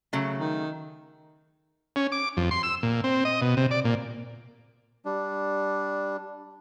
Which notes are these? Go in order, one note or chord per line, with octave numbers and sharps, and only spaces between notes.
C#3 F#3 A3
D#3
C#4
D6
F2
C6
E6
A#2
C4
D#5
B2
C3
D5
A#2
G3 D4